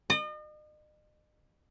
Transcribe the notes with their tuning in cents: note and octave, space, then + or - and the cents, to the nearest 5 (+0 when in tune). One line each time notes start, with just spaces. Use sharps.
D#5 -40